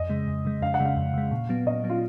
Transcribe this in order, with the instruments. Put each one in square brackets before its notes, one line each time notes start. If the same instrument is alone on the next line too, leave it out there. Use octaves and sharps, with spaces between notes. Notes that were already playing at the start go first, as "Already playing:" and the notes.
Already playing: [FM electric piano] F2 [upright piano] D#5
[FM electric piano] C#3 G#3
F2
C#3 G#3
[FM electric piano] F2 [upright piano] F5
[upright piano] F#5
[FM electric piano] C#3 G#3
[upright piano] F5
[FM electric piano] F2
C#3 G#3
A#2
F#3 B3
[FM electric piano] A#2 [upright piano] D#5
[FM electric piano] F#3 B3
[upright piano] F4